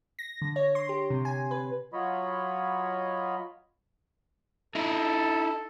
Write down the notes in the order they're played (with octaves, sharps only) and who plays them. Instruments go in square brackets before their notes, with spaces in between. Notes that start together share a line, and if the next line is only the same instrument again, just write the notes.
[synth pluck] A#6
D3
C#5
C6
G4
C3
G#5
B4
[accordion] F#3 F4 C#5 D#5 B5
[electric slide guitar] D#4 E4 [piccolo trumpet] A4